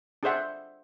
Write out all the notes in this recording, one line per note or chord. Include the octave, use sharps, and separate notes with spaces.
D4 G#4 A4 C5 E5 F#5